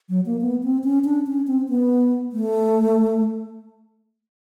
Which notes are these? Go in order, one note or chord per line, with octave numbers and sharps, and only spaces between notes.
F#3
A#3
B3
C4
C#4
D4
C#4
C4
B3
A3